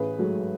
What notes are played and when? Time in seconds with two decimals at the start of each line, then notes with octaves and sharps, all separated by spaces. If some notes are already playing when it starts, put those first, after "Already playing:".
Already playing: A1 G#4 B4
0.18 G#2 F#3 A3